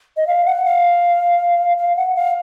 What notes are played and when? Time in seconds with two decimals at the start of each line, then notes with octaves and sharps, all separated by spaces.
0.17 D#5
0.27 F5
0.46 F#5
0.65 F5
1.78 F5
1.96 F#5
2.16 F5